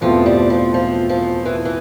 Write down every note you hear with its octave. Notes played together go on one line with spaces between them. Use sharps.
E2 B2 F3 A3 C4 F4
G2 G3
F3
F3
F3
E3
E3